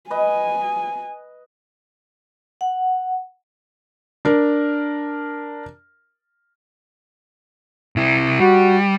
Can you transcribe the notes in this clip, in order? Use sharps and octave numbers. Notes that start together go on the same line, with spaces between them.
B4 D#5 G#5
F#5
D4 A#4
C3 E4
G3 F#4